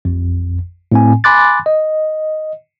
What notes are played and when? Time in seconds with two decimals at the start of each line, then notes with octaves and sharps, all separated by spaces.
0.05 A1 F2
0.92 A2 C4 G#5
1.24 G#5 B5 C6 D6 F#6 A6
1.66 D#5